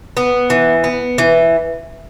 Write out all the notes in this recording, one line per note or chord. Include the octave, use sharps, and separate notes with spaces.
B3
E3
B3
E3